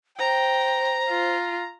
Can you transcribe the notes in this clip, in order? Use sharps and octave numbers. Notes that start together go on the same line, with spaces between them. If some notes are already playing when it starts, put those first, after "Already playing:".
C5 G5 A#5
F4